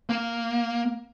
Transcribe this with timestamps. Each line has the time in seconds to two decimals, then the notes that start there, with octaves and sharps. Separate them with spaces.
0.10 A#3